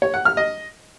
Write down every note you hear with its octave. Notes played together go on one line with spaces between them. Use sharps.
C#5
F#5
F6
D#5